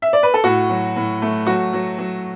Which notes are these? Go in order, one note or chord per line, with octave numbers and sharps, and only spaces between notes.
E5
D5
B4
A4
A2 F#4
F#3
A2
A3
F#3 F#4
F#3
F#3